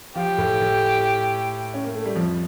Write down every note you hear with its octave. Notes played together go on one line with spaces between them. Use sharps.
F3 F4 G4
A2 A3
A2 A3
C#4
A#3
A3
G3
F2 F3